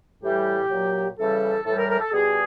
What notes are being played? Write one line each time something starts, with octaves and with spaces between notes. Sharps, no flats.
A2 E3 G3 G4
A#2 F#3
C#3 E3 G3 A4
A2 E3 G3 A4
A#4
A#4
A4
B2 G3 G#4